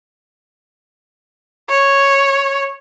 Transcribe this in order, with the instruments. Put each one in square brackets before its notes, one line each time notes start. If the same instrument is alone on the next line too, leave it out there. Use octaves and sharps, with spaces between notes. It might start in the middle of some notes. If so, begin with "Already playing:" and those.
[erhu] C#5